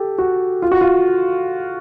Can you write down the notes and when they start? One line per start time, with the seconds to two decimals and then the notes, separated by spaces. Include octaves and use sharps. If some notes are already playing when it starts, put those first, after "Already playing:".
Already playing: G4 A4
0.18 F#4
0.62 F4
0.72 F#4
0.81 F4